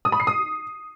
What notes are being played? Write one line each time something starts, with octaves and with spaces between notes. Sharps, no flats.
D#6
B5
C7
D#6